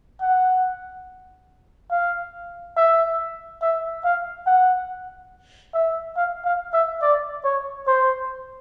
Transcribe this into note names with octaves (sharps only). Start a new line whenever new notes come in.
F#5
F5
E5
E5
F5
F#5
E5
F5
F5
E5
D5
C#5
C5